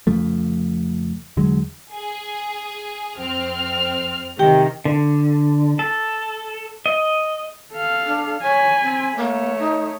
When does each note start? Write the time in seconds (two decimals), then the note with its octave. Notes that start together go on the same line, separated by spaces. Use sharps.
0.07 F2 C#3 F3 A3
1.37 E2 D3 F#3 G#3
1.92 G#4
3.17 F2 C4 F6
4.39 C3 D#3 G4 G5
4.85 D3
5.79 A4
6.86 D#5
7.72 A4 F5
8.06 D4
8.43 C#5 G#5 B5
8.83 C4
9.17 A3 A#3 C#5
9.59 D#4